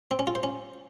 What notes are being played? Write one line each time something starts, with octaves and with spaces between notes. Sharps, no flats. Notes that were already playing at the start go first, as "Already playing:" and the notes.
C4
C#4
F4
C5
C#4